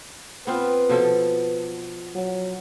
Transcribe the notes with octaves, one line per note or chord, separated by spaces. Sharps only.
B3 C4 F4 B4
B2 F3 A4
F#3